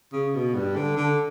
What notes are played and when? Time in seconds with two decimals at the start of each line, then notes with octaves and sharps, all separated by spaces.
0.13 C#3
0.35 B2
0.55 G2
0.76 D3
0.97 D3